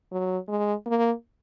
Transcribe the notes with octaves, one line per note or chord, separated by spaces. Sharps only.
F#3
G#3
A#3